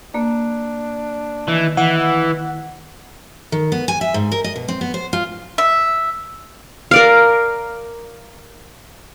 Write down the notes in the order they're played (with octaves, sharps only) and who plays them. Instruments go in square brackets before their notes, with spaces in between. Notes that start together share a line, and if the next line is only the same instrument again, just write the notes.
[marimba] A#3 [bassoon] D4
[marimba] D#3 [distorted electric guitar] E3
[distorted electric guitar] E3 [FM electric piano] F#5
[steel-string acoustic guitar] D#3
B3
G#5
E5
G#2
A#4
D#5
B2
C4
B3
C5
F4
[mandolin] E5
[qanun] A#4 D5 F5